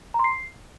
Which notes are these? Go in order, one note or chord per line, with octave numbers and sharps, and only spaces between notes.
A#5
C6
C7